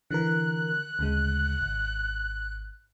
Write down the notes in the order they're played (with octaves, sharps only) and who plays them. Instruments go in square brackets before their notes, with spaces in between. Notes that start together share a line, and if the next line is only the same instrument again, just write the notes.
[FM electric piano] D3 E3 A#4 [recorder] F#6
[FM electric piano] D2 C#3 G#3
G#1